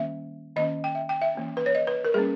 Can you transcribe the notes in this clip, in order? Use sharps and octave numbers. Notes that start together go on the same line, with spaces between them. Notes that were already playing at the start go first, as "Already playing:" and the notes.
Already playing: D#3 G3 A#3 C#4 E5
D#3 A#3 C#4 D#5
G5
E5
G5
E5
E3 A#3 C#4
B4
C#5
D#5
B4
A#4
G3 A#3 C#4 G#4